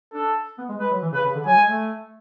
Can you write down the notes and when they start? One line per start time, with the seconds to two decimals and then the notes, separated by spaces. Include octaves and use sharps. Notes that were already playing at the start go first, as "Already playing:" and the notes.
0.13 D4 A4
0.59 B3
0.69 G#3
0.79 G#3 B4
0.91 F#3
1.02 E3
1.12 C#3 B4
1.24 C#3
1.35 D3
1.46 F#3 G#5
1.56 G#3
1.68 A3